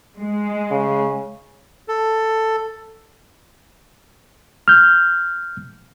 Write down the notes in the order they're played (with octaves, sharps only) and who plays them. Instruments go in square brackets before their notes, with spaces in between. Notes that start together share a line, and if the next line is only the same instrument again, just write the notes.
[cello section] G#3
[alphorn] C#3
[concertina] A4
[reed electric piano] F6 G6